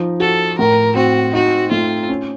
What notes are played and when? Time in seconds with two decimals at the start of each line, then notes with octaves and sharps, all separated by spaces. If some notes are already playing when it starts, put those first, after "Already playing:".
Already playing: F3 D#4
0.20 F#4 A4
0.58 A2 A#4
0.95 C4 F#4
1.33 D#4 F#4
1.71 A3 F4
2.09 C#4